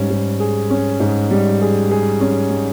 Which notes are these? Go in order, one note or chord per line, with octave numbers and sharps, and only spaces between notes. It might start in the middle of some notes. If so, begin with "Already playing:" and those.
Already playing: G#2 G3 C#4
G#2
G#4
C#4
G#2
G3
G#4
G#4
C#4
G3